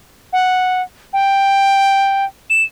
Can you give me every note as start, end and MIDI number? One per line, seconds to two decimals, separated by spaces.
0.33 0.82 78
1.13 2.25 79
2.50 2.63 100